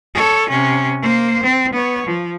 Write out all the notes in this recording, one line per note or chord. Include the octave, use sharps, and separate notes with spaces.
A4 C#5
C3 C#4
A#3 C5
C4
B3 C#5
F3